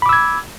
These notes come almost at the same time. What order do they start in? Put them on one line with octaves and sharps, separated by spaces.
B5 D6 E6 G#6